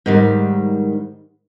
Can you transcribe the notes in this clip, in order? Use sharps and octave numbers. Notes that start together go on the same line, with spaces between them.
G#2 D#3 G3